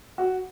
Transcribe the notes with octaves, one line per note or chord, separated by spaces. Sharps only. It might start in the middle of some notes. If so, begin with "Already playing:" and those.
F#4